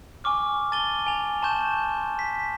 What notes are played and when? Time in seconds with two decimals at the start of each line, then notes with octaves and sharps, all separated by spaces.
0.24 G#5 C#6 D6 F6
0.72 A5 A6 D#7 G7
1.07 G#5 F7
1.42 G#5 A5 C6 C#6 G6 E7
2.19 B6